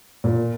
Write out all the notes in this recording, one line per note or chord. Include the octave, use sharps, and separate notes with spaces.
A#2